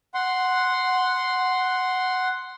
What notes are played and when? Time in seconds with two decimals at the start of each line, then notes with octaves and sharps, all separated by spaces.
0.14 F#5 C6